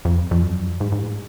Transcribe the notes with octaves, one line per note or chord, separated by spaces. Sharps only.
F2
F2
F#2
G#2
G#2
A2